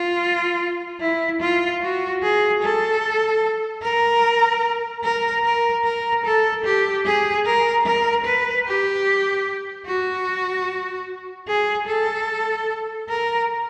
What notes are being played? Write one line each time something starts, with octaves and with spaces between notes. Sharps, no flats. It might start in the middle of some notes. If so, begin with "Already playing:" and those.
Already playing: F4
E4
F4
F#4
G#4
A4
A#4
A#4
A#4
A#4
A4
G4
G#4
A#4
A#4
B4
G4
F#4
G#4
A4
A#4